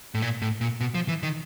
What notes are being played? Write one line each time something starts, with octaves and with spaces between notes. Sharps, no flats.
A2
A#2
A2
A#2
B2
F3
E3
D#3